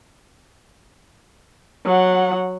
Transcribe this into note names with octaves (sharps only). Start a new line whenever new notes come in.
F#3 F#5